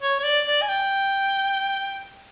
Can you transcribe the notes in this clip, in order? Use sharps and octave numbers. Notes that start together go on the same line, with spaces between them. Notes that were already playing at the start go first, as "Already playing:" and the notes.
C#5
C#5
D5
D5
G#5
G5